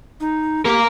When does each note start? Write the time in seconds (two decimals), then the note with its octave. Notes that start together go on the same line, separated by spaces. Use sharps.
0.20 D#4
0.65 A#3 G4 A#4